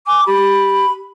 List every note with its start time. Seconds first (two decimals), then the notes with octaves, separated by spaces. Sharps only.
0.07 G#5 D6
0.26 G4 B5